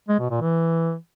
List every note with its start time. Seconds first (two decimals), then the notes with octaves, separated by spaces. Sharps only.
0.09 G#3
0.20 B2
0.30 A#2
0.41 E3